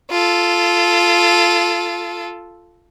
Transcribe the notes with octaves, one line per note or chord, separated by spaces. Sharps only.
F4 A4